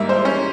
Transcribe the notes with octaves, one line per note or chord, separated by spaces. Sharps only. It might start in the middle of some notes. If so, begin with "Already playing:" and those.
Already playing: G#2 G3 A#3 E5
C5
C#4